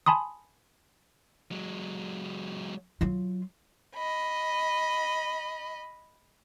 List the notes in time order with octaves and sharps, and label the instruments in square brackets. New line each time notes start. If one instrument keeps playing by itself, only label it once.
[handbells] G#5 A5 B5 C6 D#6
[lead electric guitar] F#3 G#3
[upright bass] F#3 F4
[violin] D#5 B5